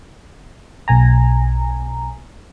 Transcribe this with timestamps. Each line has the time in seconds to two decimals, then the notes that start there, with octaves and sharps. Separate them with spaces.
0.88 B1 B2 G#5 A#5